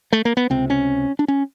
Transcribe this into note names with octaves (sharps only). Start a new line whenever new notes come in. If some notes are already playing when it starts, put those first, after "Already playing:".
A3
A#3
B3
C#2 C3 C4
C#4
D4
C#4